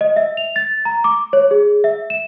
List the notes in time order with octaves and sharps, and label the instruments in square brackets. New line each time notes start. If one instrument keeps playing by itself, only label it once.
[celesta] D#5
E5
F7
A6
A#5
D6
C#5
G#4
E5
E7